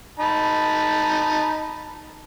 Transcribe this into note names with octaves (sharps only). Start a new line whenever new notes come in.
D#4 A5 B5